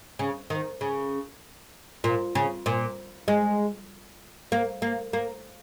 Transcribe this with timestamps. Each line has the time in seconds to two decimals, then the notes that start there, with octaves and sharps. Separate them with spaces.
0.19 C#3
0.50 D#3
0.81 C#3
2.04 A#2
2.35 C#3
2.66 A#2
3.28 G#3
4.52 A#3
4.82 A#3
5.13 A#3